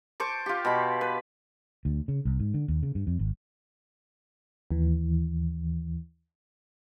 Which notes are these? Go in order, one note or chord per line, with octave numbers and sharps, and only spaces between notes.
C5 A5 C#6 D6
F4 G4
B2 B5
B4
D2
C#3
C2
G#2
D3
D#2
C#3
G2
F2
G#1
D#2 E3